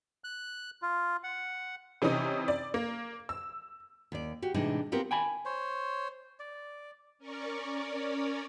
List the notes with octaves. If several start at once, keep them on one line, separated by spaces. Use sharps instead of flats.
F#6
F4
F#5
C3 E3 C#4 D#4 D#6
D5
A#3
E6
D#2 D5
F#4 G4
A2 C3 E3 G#3 D4 D#4
B3 C4 F4 G4 A#4
G5 G#5 B5
C5 C#5
D5
C#4 A#4 C#5 D5